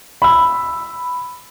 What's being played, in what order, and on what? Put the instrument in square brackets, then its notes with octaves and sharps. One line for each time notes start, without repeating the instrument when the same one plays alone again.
[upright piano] B5 E6